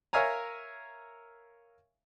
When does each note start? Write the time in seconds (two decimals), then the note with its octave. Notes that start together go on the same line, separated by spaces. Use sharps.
0.13 A#4 C#5 E5 F5 G#5 A#5